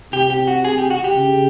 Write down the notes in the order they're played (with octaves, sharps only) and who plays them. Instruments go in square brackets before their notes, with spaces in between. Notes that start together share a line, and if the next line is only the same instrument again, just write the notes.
[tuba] C3 [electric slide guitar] G4
[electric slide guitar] G4
F#4
G#4
G4
F#4
G4
[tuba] C#3